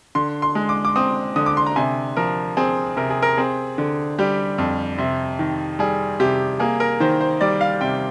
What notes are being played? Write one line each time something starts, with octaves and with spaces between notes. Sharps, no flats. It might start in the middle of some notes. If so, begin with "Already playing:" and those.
D3 C6
C6
G#3
D6
D6
C4 D#6
D3 D#6
D6
C6
A#5
C3 G#5
F3 A#4
C4 G#4
C3 A#4
G#4
A#4
C4 G#4
D3
G3 G4
F2
C3
D#3
G3 G#4
C3 G4
A#3 G#4
A#4
D#3 C5
C5
G3 D5
F5
C3 G5